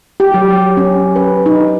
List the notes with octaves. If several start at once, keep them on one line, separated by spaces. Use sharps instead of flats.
G4
F#3
C#4
B4
D#4